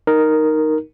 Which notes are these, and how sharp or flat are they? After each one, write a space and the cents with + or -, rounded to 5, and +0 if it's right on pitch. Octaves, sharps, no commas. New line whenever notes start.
D#4 +0 A#4 +0